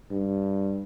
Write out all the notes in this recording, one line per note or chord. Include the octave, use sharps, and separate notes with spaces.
G2